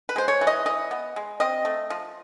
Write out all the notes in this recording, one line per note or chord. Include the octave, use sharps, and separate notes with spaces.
B4
G#3 C5
C#5
E3
D#5
E3 D#5
B3
G#3
C4 D#5
A3
F3